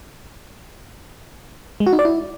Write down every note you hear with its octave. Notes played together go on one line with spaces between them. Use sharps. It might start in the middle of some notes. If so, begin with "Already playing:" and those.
G#3
F#4
D#4
D5
E4